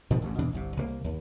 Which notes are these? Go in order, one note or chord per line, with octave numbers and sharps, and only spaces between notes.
A#2 D#3 F3 G#3
A1 D2 G2
E2 B2 E3 D4
G1 C2 C3
C2 G3 A#3
D#2